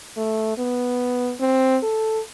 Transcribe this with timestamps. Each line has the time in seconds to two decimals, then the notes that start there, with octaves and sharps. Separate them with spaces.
0.17 A3
0.58 B3
1.40 C4
1.83 A4